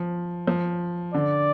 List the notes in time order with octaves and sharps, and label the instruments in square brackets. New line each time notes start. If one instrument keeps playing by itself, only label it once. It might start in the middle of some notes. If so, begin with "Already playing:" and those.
Already playing: [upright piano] F3
F3
[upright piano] D3 [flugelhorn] D5